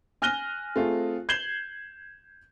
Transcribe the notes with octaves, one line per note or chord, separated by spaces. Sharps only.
G#5 F6 F#6 A#6 D#7 G7
A3 C4 F4 G#4
G6 G#6 C7 E7 F#7 G7